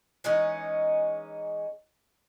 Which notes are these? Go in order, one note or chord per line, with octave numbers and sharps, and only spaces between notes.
E3 G#3 C#4 D#4